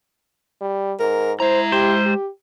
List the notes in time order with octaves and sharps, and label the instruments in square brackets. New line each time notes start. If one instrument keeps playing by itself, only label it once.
[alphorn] G3
[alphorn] G#2 [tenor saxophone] A#4
[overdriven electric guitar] G#3 A#5 [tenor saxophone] E4 [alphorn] C5
[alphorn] G4 [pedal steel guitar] C5
[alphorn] G4